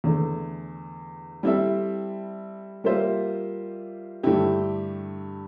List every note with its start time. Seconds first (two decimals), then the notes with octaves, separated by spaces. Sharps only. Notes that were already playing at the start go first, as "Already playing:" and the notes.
0.04 E2 D3 A3
1.43 G3 C4 E4 A4 E5
2.84 G3 A#3 F4 C5 E5
4.23 G2 D3 A3 E4 G4